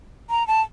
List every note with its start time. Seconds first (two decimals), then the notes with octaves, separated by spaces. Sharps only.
0.30 A#5
0.47 A5